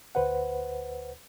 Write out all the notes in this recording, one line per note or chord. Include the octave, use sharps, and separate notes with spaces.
D2 B4 C5 F#5